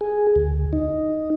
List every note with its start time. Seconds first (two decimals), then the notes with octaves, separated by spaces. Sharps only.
0.01 G#4
0.36 D2
0.73 D#4